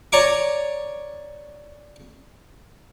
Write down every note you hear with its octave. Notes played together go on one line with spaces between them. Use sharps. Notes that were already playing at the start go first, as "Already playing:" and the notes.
C#5 D5 G#5 A#5 C#6 D6